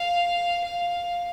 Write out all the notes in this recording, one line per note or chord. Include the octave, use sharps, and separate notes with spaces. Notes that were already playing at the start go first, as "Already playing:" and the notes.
Already playing: F5
F5